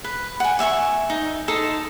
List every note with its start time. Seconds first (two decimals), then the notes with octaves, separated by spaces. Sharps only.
0.04 B4
0.40 F#5 G#5
0.59 D5 E5 G#5 C#6
1.10 D#4
1.48 D#4 A4 A5 C6